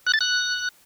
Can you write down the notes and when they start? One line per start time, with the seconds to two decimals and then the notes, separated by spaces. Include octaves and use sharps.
0.07 F#6
0.14 A6
0.21 F#6